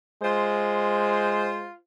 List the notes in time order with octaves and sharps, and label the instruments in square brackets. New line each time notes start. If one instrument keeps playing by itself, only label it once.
[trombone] G#3 [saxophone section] F4 C5